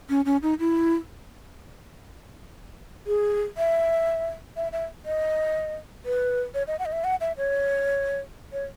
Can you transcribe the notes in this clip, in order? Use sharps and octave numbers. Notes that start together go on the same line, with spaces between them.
C#4
C#4
D#4
E4
G#4
E5
E5
E5
D#5
B4
C#5
D#5
F#5
D#5
E5
F#5
E5
C#5
C#5